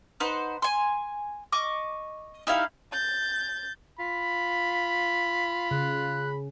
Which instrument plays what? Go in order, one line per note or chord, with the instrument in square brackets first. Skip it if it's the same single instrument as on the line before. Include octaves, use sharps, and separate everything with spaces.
[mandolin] D#4 B4 C5 F#5
G#5 C6
D#5 C#6 D6
D#4 E4 G4 F5
[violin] G6 A6
[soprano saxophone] F4 [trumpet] B5 [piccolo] B6
[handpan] C#3 [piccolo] F#6